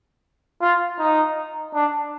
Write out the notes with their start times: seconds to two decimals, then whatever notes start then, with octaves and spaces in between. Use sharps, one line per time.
0.61 F4
0.99 D#4
1.74 D4